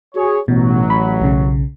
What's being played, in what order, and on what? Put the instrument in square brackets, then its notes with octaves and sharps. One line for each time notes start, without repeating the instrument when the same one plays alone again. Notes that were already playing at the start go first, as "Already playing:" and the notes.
[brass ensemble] F#4 G#4 C#5
[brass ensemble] A1 F#3 [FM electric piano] B2
[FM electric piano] B5
B1 C#3